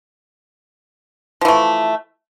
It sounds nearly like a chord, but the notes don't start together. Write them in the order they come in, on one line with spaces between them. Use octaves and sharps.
F3 E3 A3